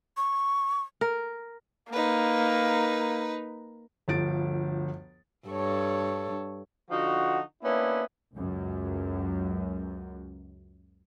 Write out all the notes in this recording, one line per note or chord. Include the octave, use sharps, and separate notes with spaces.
C#6
A#4
A#3 D#4 B4
G1 D2 F3 A6 D7
G2 A4 C#5
D3 F3 D#4 F#4
A#3 B3 C#4 D4 E4
C#2 F#2